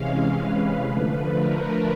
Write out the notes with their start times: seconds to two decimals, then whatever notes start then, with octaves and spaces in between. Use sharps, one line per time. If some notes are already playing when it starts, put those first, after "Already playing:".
Already playing: C3 E3 G#3 C#4 F5
0.34 B4
0.84 D3 F3 A3 B4
1.35 A#4